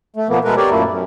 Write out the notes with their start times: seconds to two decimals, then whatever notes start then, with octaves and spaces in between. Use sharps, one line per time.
0.16 A3
0.29 B2 F3 A#3 B3
0.44 B2 G#3 A3 B3 A#4 B4
0.57 G4 A#4 C#5 D5
0.71 F#2 A#2 A3 A#3 E4
0.89 F#2